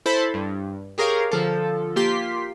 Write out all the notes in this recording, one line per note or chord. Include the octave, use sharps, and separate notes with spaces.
E4 A4 C5 A5 B5
G2
G4 G#4 A#4 C#5 F5
D3 F3 A4
A#3 F4 G4 C6 B6